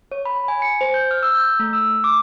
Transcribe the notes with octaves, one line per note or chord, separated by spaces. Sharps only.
C#5
B5
G#5
C#7
C5
G6
F6
E6
G6
A3
E6
D6